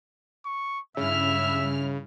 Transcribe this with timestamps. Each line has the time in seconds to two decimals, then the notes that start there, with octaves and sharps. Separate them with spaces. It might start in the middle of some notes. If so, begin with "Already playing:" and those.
0.45 C#6
0.97 G2 C#3 E4 E5 F6